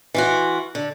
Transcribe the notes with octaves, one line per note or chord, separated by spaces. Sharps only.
E3 F4 F#4
D3